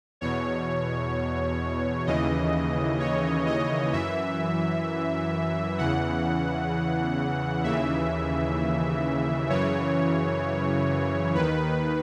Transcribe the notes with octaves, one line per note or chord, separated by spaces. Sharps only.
E2 B2 C#5
D#2 C#3 E3 D#5
C#5
D#5
F#2 E3 E5
E2 C#3 E3 F#5
D#2 C#3 E3 E5
F#2 C#3 E3 C#5
D#2 D#3 B4